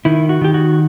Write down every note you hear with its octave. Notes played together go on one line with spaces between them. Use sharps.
D#3 E4
F#4
D#3 G4
F#4